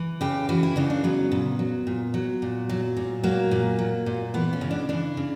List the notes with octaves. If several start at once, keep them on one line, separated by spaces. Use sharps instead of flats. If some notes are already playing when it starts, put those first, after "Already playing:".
Already playing: E3
C#3 G4
E3 F#4
E4
C#3 D4
D4
F#3 B3
A#2
F#3
A#2
F#3
A#2
F#3
A#2
F#3 A#3
A#2
F#3
A#2
E3 B3
C#4
C#3
D4
E3 D4
C#3